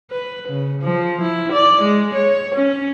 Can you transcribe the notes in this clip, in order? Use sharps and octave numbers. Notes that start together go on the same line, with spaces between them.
B4
C#3
F3
E4
D5
G#3
C#5
C#4